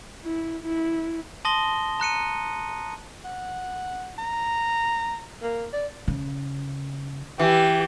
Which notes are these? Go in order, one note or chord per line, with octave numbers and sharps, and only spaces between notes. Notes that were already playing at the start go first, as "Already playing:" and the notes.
E4
E4
A5 C6 D#6 A#6 G7
A#5 F#6 C#7 D#7
F#5
A#5
A#3
D5
C#3
E3 G4